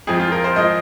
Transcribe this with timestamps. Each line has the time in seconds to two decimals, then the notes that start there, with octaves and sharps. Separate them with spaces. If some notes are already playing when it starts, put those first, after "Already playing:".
0.07 F2 F3 G#3 G#4
0.20 F4
0.32 A#4
0.44 C5
0.56 F3 G#3 D#5